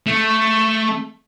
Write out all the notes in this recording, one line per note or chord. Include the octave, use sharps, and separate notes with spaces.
A3